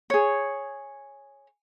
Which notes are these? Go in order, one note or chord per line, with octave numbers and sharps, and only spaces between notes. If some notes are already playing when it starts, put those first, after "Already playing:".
G#4 C#5